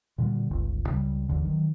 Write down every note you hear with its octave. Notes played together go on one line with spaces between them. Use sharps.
A#2 D3 E3 G3
G1 C#2
C#2 C#3 G3
G#1 D#2 D3 E3
D#3 F#3